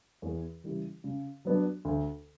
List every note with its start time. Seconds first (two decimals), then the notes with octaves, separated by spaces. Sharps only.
0.22 E2
0.64 C#3 E3 G3
1.04 C#3
1.45 F#3 B3 D4
1.85 D2